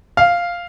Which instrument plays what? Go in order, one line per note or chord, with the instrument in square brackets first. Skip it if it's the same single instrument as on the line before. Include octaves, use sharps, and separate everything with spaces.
[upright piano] F5